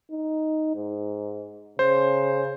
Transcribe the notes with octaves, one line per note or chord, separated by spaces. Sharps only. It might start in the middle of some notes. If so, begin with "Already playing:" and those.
D#4
G#2
C#3 C5